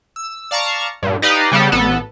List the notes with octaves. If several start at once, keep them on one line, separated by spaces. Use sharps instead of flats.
E6
D5 F5 A5 A#5 C#6
G2 A#2
D#4 G4 B4 D5 D#5 F5
C#3 G3 B3 G4 A4
A1 B3 A4